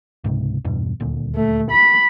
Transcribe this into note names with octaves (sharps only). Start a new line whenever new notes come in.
C#2 G#2 C3
E2 G2 B2
D#1 D2 A#2
A3
B5